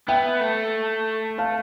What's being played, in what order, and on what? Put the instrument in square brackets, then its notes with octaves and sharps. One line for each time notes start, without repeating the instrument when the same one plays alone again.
[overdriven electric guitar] B3 [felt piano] E5 G5
[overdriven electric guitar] A3
[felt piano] F5 A5